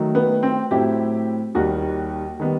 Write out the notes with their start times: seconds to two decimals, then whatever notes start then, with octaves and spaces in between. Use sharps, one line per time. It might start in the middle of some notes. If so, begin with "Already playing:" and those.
Already playing: D#3 F#3 A3
0.15 B3
0.43 C4
0.71 A2 F#3 C4 E4 G4
1.55 D#2 D#3 G3 F#4
2.40 D#3 G3 B3